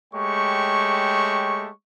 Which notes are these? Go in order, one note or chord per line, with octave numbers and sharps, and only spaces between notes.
G#3 A3 G4 C#5 G5 C#6